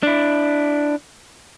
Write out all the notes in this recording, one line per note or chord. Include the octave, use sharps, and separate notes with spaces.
D4 E4